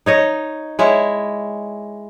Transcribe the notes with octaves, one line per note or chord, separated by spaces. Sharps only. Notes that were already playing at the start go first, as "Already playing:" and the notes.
D#4 C#5 D#5
G#3 E4 C#5